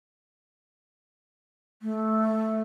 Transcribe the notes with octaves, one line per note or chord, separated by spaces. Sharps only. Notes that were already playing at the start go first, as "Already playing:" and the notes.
A3